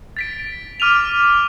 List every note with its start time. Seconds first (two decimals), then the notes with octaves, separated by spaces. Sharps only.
0.17 A6 B6 D7
0.80 D6 F6 D#7 F7